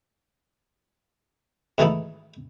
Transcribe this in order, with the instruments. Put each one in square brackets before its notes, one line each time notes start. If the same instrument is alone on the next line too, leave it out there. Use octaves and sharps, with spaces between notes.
[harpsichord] G#2 D#3 E3 A3 D#4 E4